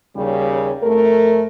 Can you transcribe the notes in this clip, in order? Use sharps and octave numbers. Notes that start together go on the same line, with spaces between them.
D#2 C#3 G3
F2 A3 A#4